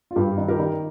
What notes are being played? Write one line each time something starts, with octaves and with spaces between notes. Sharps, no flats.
F4
G2 G4
D#3
G4 A#4
D#3